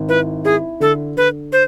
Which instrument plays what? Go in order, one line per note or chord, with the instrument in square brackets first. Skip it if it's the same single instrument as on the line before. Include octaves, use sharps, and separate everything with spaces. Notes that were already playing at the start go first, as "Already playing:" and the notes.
Already playing: [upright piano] G#1
[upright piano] E4 [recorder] B4
[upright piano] E4 [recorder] G#4
[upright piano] D3 [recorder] A4
[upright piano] D3 [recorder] B4
[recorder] C5